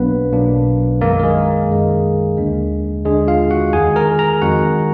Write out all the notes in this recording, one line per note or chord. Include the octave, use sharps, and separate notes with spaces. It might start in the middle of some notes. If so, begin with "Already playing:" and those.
Already playing: B1 B2 F#3 A#3 B3 D4 B4
B1 B2 F#3 A#3 D4
F#2 D#3 G#3 A#3 A#4
A#4
G#3 G#4
F#2 D#3 G#3
D#2 D3 G#3 D4
D#2 D3 G#3 D4 G#4
F4 F5
F#4 F#5
F2 D#3 G#3 G#4 G#5
A#4 A#5
A#4 A#5
F2 D#3 G#3 F#4 F#5